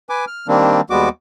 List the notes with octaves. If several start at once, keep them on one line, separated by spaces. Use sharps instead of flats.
B4 G#5 D6
F6
D#3 G3 A#3 C4 D4
D#2 G3 G#3 B3 F#4 D6